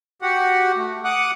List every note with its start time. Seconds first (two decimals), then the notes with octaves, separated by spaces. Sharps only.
0.22 F#4 G4 F#5
0.76 A3
1.05 F#5 D6 D#6 F#6